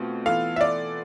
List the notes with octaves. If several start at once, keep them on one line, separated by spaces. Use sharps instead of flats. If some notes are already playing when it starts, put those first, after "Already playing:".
Already playing: B2 A3 C4 F4
E3 B3 F4 A4 F5
E5
D5